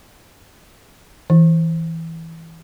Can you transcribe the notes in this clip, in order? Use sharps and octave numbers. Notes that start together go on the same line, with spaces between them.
E3